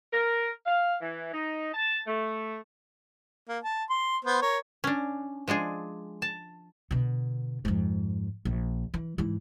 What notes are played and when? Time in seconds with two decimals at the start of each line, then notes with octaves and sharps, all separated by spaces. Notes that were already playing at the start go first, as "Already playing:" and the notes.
0.11 A#4
0.66 F5
1.00 E3
1.32 D#4
1.73 A5
2.05 A3
3.49 A#3
3.64 A5
3.90 C6
4.25 B3 C5
4.42 A#4 C#5
4.84 C#4 D4
5.48 F3 G#3 D4 G#4
6.22 A5
6.91 B2 D3
7.65 F2 G#2
8.45 A#1
8.94 E3
9.18 G#2 E3